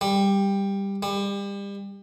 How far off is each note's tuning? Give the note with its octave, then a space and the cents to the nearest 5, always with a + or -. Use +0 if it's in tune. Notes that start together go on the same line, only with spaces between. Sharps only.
G3 +10
G3 +30